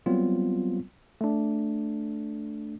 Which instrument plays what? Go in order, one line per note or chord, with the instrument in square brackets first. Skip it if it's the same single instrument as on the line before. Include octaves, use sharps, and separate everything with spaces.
[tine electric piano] F#3 G3 B3 C4 F4
A3 D4